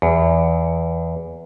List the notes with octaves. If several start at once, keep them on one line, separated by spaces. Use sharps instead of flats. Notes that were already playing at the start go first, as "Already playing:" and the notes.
E2